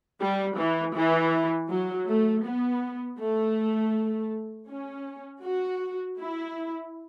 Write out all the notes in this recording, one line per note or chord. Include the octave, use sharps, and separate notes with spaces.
G3
E3
E3
F#3
A3
B3
A3
C#4
F#4
E4